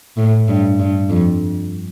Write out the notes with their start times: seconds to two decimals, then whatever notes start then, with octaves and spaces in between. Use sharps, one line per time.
0.17 A2
0.48 G2
0.79 G2
1.09 F2